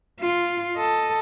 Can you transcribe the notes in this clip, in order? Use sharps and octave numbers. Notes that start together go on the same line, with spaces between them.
F4
A4 D#5